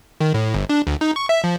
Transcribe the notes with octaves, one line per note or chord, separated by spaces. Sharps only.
D#3
A2
G1
D4
D2
D#4
C#6
E5
F3